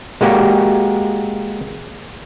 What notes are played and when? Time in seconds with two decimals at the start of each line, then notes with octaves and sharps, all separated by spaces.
0.21 G#3 A#3 F#4 G4